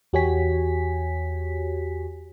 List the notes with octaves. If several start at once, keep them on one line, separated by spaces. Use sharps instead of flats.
E2 F#4 G4 C#5 G#5 B6